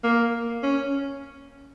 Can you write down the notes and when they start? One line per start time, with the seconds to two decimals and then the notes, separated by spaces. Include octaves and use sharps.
0.04 A#3
0.63 C#4